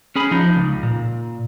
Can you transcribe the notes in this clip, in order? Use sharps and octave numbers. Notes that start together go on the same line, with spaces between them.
C#4 G#4 B5
F3 D#4
C#2
A#2